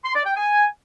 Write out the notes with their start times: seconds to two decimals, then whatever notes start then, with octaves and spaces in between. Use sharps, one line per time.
0.04 C6
0.15 D5
0.25 G5
0.36 G#5